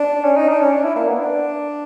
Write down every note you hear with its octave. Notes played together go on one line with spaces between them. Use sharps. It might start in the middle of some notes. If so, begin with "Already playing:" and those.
Already playing: D4
C#4
D#4
D4
C#4
D4
E4
A#3
B3
D4